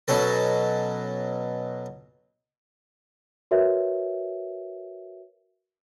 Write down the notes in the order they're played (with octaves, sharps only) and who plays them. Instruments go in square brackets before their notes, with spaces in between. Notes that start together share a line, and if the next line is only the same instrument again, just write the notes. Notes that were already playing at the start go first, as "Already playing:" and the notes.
[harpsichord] B2 F#3 C#4 A4
[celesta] F#4 A#4 B4 C#5 E5